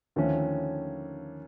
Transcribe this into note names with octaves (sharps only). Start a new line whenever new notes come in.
D#2 D3 F3 A3 C#4